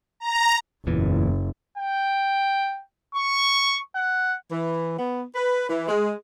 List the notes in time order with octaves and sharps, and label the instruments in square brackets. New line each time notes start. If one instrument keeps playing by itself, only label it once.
[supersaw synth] A#5
[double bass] F#1 [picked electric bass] E2 A#2 E3
[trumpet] G5
C#6
F#5
[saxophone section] E3
B3
B4
E3
G#3